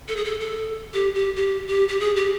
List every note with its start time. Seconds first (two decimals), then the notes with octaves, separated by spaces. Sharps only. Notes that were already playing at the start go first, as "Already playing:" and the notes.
0.08 A4
0.16 G#4
0.24 A4
0.40 A4
0.94 G4
1.15 G4
1.36 G4
1.67 G4
1.88 G4
2.00 G#4
2.16 G4